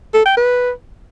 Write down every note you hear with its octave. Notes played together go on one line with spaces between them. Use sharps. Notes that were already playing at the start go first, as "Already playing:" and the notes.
A4
G5
B4